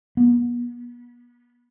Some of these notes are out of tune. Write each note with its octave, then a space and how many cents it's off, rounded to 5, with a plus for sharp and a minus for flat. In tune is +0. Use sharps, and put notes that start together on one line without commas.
B3 -35